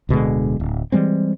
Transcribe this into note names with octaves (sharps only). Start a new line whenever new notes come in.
D1 B2 D3 G#3
D1
E3 G3 G#3 C4